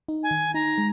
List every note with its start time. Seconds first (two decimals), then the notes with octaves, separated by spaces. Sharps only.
0.08 D#4
0.23 G#5
0.31 D#3
0.54 D#4 A#5
0.78 G#3